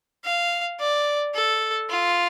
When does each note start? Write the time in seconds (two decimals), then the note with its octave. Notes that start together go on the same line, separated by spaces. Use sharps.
0.24 F5
0.80 D5
1.34 A4
1.90 F4